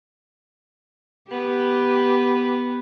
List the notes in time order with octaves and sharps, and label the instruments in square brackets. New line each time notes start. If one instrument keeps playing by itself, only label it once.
[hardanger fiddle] B3 [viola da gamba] G4 B4